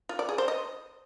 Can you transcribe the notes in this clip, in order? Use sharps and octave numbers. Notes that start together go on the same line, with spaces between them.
F4
D5
G#4
C5
D#5